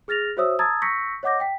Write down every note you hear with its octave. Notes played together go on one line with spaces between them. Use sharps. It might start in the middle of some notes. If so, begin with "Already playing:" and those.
G#4 F6 A6 A#6 F7
F#4 C5 C#5 E5 D#6 E6
A5 A#5 D#6 E6 G#6 A6
C#6 E6 G6 A#6 B6 C#7
C#5 D#5 F#5 D6 G6 A#6
G5 B6